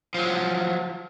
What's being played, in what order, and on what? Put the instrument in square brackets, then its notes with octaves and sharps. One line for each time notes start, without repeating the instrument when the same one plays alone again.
[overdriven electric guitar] F3 F#3